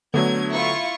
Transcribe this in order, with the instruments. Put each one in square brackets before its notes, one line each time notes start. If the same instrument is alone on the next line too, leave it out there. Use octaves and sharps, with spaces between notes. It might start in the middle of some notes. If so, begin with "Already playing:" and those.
[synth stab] D3 [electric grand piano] F#3 A3 B3 [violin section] G#6
[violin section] E4 F4 C#6